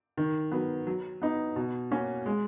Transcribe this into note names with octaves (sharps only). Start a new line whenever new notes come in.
D#3
F#3 B3
F#3
B3 D#4
B2
A#3 C#4 F#4
G#3